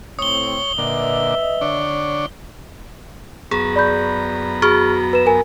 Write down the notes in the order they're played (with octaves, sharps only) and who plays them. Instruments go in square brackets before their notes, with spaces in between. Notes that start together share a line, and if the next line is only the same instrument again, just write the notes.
[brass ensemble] A2 C4 [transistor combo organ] C#5 [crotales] D#6 G7
[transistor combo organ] A#2 D3 [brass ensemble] B4 D#5 E5
[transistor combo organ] D3 D4 C#5
[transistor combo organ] F#2 B3 A#5 [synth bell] G#4
[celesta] D5 B5 G6
[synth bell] F#4 [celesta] G#4 C#6 F6
[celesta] B4 E7
A#4 G#5